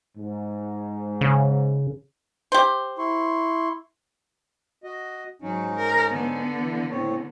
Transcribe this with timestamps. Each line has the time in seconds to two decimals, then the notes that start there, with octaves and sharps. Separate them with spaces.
0.17 G#2
1.21 C#3
2.52 G4 C5
2.98 E4 C6 C#6
4.84 F#4 D#5
5.42 G#2 F#3 C#4 D#4
5.76 A#4
6.12 D3 B3
6.57 E3
6.91 A2 C4 C#5